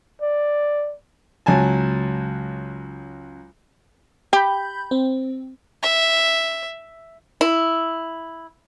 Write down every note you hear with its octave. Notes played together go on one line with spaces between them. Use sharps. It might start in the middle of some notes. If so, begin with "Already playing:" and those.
D5
C#2 F#3 G#5 A5
G4 B5 G6
C4
E5
E4